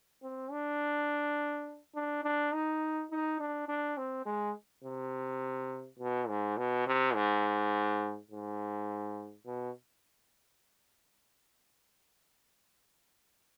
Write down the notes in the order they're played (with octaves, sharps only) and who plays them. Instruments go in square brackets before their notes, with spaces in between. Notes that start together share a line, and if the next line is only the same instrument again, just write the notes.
[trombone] C4
D4
D4
D4
D#4
D#4
D4
D4
C4
G#3
C3
B2
G#2
B2
C3
G#2
G#2
B2